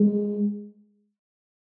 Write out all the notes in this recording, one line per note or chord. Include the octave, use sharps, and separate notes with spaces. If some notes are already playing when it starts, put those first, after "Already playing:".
Already playing: G#3